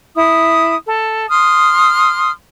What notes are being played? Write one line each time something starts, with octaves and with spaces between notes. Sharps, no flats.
E4 D#6
A4
C6 D#6 F6